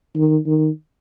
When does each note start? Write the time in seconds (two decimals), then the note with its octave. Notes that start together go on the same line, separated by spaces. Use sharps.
0.15 D#3
0.46 D#3